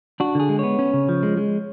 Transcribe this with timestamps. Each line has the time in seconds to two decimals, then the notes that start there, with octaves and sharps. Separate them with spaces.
0.20 D4 F#4
0.35 D3 G#4
0.49 G#3
0.59 B3 C#5
0.79 C#4
0.94 C#3
1.09 F3
1.23 G#3
1.37 G#3